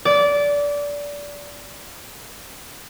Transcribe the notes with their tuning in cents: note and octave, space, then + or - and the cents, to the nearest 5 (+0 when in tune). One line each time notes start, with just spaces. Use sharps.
D5 -20